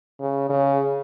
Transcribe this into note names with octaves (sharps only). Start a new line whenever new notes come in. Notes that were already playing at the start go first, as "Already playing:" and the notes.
C#3
C#3